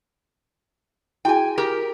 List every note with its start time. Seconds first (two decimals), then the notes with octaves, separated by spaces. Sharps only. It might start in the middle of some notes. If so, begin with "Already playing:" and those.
1.25 E4 F#4 G#4 G5 G#5
1.58 G4 A#4